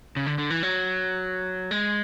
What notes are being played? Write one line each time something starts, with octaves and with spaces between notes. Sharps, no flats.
C#3
D3
D3
E3
F#3
G#3